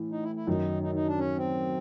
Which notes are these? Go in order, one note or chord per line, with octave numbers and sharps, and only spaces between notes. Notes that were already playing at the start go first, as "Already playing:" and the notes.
Already playing: A2 E3
D#4
E4
E4
F#2 D#3 F#3 D#4
D#4
D#4
D4
C#4
C4